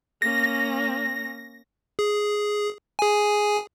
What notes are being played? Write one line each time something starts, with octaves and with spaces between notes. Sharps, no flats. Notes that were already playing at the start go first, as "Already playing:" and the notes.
A#3 C#4 A#6
G#4
G#4 G#5